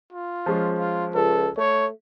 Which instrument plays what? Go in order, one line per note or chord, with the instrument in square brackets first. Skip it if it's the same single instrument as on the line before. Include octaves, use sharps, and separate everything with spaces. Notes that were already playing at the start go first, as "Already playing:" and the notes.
[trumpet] F4
[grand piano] F3 G#3 C#4
[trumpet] F4
[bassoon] C#2 [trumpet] A4
[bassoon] A3 [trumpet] C#5